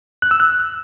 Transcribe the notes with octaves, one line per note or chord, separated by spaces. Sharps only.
F#6
E6
F#6